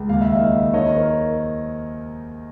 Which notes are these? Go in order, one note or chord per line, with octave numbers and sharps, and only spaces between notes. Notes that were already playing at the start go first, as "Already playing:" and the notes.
Already playing: C#2
D#2 F5
E5
D#5 F5
D#3
D#3 C#5 D#5
A#4 C5